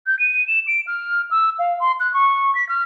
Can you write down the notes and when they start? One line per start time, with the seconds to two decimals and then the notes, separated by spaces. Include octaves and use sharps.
0.07 G6
0.19 D#7
0.48 E7
0.67 D7
0.87 F6
1.31 E6
1.59 F5
1.80 C6
2.00 F#6
2.14 C#6
2.55 B6
2.69 F6